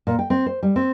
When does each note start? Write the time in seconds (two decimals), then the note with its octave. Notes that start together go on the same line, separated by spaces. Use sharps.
0.07 A#2
0.19 G5
0.30 C4
0.46 C5
0.63 G3
0.76 C4